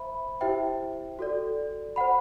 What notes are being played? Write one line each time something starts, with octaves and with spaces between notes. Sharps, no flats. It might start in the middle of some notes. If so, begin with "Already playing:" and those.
Already playing: C5 E5 B5
E4 G4 C5 E5 G5
F#4 A4 D5
C5 F#5 B5